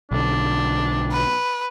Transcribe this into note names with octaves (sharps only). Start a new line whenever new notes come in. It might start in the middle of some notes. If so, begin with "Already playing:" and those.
B1 D3 D4
B4